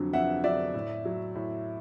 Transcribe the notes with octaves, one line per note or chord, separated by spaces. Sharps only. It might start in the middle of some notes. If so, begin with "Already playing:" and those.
Already playing: F2 D3 F#3
F2 E5 F#5
D3 F#3 D5 E5
A2
F#3
A2